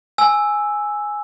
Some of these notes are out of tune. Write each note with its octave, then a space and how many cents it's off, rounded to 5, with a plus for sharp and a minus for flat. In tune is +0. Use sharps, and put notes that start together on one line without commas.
G#5 +0 E6 +0